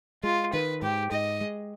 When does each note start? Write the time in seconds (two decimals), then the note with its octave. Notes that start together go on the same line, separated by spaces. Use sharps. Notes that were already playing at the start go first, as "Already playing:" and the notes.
0.23 G#3 F4
0.53 D#3 B4
0.82 G#2 G4
1.12 G#2 D#5
1.41 G#3